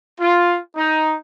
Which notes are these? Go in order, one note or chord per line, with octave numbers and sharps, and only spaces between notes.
F4
D#4